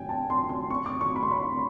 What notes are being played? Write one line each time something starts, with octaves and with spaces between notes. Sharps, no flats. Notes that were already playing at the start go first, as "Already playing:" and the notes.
Already playing: G5 G#5
A5
C6
C6
C#6
D6
C#6
B5
C6
B5